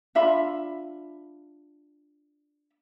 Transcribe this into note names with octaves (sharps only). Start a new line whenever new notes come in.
D4 F4 E5 B5